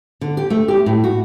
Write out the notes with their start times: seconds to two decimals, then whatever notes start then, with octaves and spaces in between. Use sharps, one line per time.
0.21 D3
0.37 G4
0.50 A3
0.68 G4
0.86 A2
1.04 F#4